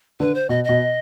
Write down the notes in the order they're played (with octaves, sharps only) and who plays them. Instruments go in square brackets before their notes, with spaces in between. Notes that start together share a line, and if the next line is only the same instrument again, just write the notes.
[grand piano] D3 [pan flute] B4
[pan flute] C5
[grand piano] B2 [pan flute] D#5
[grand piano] B2 [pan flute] D#5